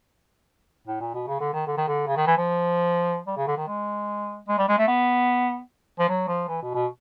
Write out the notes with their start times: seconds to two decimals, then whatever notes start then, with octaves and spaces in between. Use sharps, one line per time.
0.87 A2
1.00 A#2
1.14 B2
1.27 C#3
1.40 D3
1.53 D#3
1.67 D3
1.77 D#3
1.88 D3
2.07 C#3
2.17 D#3
2.27 E3
2.37 F3
3.27 G3
3.37 C#3
3.48 D3
3.57 D#3
3.68 G#3
4.48 G#3
4.58 G3
4.68 G#3
4.78 A3
4.88 B3
5.99 F3
6.09 F#3
6.28 F3
6.49 E3
6.62 B2
6.74 B2